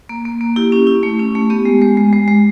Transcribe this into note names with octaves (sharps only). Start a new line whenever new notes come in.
A#3
A#3
A#3
E4 G4
C#4
E4
A3
C#4
A3
B3 G4
G#3
G#3
G#3
G#3
G#3